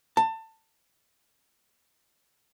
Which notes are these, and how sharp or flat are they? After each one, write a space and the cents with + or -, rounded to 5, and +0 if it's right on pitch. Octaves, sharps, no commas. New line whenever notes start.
A5 +25